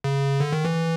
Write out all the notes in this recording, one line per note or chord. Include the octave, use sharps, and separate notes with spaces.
C#3
D3
D#3
E3